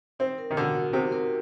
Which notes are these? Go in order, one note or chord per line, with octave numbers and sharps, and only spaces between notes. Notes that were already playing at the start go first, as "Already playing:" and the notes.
C4 D#4
A#4
D#3
D3 F#4
F#5
C3 D#4
A#4